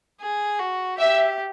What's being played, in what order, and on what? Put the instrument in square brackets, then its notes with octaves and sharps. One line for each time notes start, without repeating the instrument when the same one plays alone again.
[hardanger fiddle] G#4
F#4
[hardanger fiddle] G4 [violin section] E5